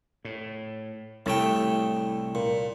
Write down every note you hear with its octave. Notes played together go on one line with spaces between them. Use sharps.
A2
C2 A2 A3 G5
A#2